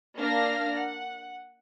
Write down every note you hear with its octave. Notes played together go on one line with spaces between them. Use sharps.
A#3 D4 D5 F5 F6 A#6
F#5